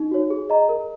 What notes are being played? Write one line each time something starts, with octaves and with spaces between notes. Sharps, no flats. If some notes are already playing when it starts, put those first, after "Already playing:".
Already playing: D#4
F#4 C#5
G#4
D#5 A#5
A#4